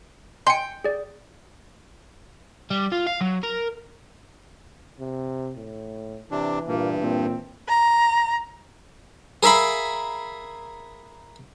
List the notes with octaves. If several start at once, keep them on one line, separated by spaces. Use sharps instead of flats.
D#5 G5 G#5 C6 C#7
G#4 D5
G3
F4
F5
F#3
A#4
C3
A2
C3 E3 D4
G2 A#2 A#3
A#2 C4
A#5
G#4 A#4 E5 F5 B5